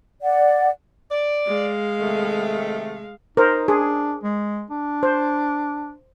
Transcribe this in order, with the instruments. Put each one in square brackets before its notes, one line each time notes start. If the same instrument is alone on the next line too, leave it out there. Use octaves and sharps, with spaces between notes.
[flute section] D5 F#5
[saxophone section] D5
[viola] G#3 F5
[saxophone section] C3 D#3 A3
[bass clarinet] D#4 [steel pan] A#4 C5
[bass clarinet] D4 [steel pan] G#4
[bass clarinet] G#3
D4
[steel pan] C5